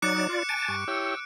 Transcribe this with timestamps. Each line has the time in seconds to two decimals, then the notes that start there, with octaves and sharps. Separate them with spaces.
0.02 F#3 D#4 D5 D6 F#6 C#7
0.29 F4 D5
0.49 G#5 A5 A6 D7
0.68 G2 C#6
0.88 E4 G4 C#5 E6